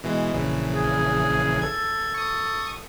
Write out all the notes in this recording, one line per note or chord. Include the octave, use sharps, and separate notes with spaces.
B2 E3 G#3
A#1 C#3 E3
G#4
A4 G#6
C#6 D#6